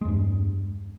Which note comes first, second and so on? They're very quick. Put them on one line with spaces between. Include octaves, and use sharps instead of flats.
G#3 E2 G2